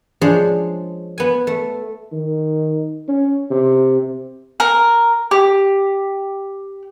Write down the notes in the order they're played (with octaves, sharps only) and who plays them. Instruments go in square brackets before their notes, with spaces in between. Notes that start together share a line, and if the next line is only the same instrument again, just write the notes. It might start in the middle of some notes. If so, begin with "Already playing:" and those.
[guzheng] F3 G#3 D4 G#4 C5 C#5
B3 G#5
A3
[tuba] D#3
C#4
C3
[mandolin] A#4
G4